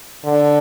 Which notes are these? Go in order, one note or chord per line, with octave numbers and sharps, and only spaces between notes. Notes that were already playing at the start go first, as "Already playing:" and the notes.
D3